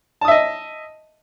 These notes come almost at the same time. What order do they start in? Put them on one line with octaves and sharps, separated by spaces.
A5 D#6 E5 D#5